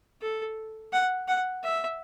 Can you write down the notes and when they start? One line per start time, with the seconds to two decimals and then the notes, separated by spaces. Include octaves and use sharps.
0.22 A4
0.93 F#5
1.28 F#5
1.63 E5